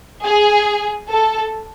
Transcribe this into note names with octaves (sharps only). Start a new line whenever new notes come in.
G#4
A4